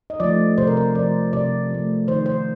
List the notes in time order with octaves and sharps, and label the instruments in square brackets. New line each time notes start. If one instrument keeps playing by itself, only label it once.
[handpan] D#5
F3 A3 D5
C3 C5
A#4
C5
F3 A3 D5
C3 D5
F3 A3
D#3 C5
C5